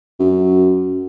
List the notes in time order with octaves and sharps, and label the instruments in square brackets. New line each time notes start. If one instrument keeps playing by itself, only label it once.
[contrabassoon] F#2